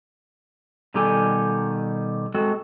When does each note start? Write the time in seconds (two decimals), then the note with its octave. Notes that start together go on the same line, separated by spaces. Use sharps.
0.94 B2 D#3 G3 G4 A4 G#5
2.35 G#3 C4 F#4 A4